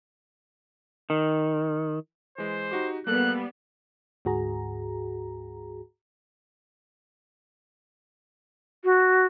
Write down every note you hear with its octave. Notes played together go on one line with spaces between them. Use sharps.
D#3
E3 G#3 C5
D#4 F#4 G4
G3 A#3 B3 A4 A#4 F#6
D2 G#2 F#4 G#4 A#5
F#4